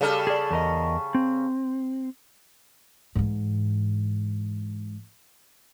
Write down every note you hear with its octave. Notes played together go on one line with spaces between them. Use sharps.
C#3 G3 A4
G#4 D5
E2 A#4 D#5
C4
G#2 E3